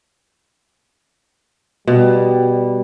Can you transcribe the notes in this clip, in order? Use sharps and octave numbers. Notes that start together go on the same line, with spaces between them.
B2 G3